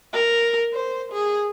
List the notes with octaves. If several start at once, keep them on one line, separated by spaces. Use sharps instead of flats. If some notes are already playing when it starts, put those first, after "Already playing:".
A#4
C5
G#4